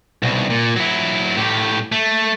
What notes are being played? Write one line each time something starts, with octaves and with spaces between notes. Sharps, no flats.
C2 B2
A#2
F#3 E4
A2 G4
A3